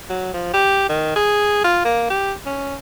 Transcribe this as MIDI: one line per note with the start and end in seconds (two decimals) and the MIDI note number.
0.09 0.34 54
0.34 0.51 53
0.54 0.87 67
0.89 1.12 51
1.15 1.62 68
1.64 1.81 65
1.85 2.06 58
2.10 2.32 67
2.46 2.75 61